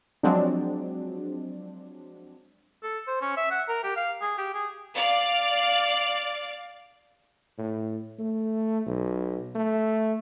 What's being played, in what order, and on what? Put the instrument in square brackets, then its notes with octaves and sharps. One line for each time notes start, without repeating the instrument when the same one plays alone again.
[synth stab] F3 F#3 G#3 C4 D4
[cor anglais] A4
C5
C#4
E5
F#5
A#4
G4
F5
G#4
G4
G#4
[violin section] D5 F5
[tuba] A2
A3
B1
A3